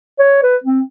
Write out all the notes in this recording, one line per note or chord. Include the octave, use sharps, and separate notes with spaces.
C#5
B4
C4